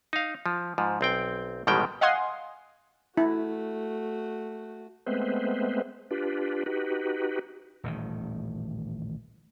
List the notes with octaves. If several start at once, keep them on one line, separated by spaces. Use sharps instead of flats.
D#4 F5
F3
G#2 F3
B1 C4 G5
A1 B2 D#3 G3 G#3 G5
D#5 F5 F#5 G#5 C6 D#6
A3 E4 F#4
G#3 A3 B3 C4 B4 C5
D4 F4 G4 B4
D#4 F#4 G4 B4
D#1 A1 D#3